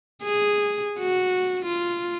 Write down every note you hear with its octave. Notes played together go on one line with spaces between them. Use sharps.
G#4
F#4
F4